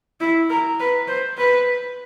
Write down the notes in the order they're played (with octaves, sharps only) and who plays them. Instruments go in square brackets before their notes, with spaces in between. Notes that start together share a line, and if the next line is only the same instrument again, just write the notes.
[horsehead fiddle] E4
A#4
B4
C5
B4